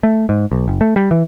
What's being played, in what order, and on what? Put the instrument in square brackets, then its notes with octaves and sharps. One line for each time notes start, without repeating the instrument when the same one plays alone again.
[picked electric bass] A3
G#2
B1
F#1
A3
G3
E3